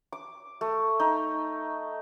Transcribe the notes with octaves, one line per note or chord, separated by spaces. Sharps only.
D6
A3
D#4